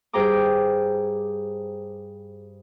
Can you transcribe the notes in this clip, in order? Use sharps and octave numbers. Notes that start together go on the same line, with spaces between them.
G2 G#4 C5 G5 A#5 D6